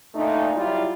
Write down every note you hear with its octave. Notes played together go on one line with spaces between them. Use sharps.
A#2 A3 D4 D#4
F#3 G3 E4 F4